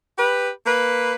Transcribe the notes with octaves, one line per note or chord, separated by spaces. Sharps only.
G4 B4
A#3 B4